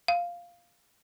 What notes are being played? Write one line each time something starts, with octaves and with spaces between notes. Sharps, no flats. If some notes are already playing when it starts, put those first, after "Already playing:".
F5